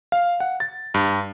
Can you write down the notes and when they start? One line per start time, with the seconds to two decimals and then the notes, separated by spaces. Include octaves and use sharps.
0.12 F5
0.40 F#5
0.60 A6
0.94 G2